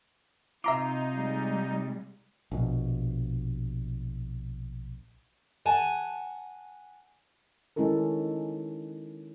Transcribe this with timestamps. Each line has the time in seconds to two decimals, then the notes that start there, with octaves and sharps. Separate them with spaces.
0.64 C3 D#4 F4 E5 A#5 D6
1.13 G3 G#3
2.52 A#1 B2
5.66 F#5 G#5 A5
7.76 D#3 G#3 C#4 E4 A4 A#4